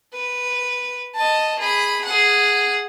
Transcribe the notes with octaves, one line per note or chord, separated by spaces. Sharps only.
B4
D#5 A5
G#4 B5
G#4 F#5